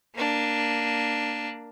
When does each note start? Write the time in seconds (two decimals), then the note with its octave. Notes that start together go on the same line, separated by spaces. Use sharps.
0.15 A#3 D4